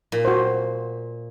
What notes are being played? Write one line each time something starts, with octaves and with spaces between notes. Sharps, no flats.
A#2
F#4 C5